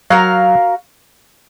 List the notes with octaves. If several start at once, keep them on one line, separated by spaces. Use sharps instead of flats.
F#3 F#4 A#4 F5